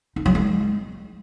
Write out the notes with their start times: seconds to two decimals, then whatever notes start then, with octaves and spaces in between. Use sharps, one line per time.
0.16 D#4
0.26 F#3
0.35 G#3